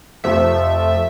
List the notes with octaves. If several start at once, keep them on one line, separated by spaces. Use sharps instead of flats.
F2 C3 F3 A3 E5